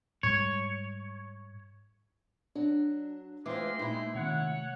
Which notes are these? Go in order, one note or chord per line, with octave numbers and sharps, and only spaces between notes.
G#2 G3 C#5
F#3 D4
E3 G#3 A3 F4 C5 G5 C6 D6
A#2 D#4 E4
C3 D#3 C#5 F#5